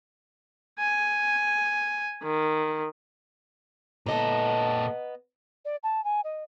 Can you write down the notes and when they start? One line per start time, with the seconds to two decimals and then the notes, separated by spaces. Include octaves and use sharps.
0.80 G#5
2.23 D#3
4.06 A#2 B3 A4 D#5 A#5
5.65 D5
5.83 A5
6.04 G#5
6.24 D#5